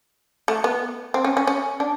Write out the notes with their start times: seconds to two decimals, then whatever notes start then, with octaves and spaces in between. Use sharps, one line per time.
0.48 A3
0.64 B3
1.14 C4
1.24 C#4
1.37 C#4
1.47 C#4
1.80 D4